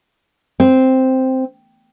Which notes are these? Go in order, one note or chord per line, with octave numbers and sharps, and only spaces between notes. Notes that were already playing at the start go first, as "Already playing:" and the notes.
C4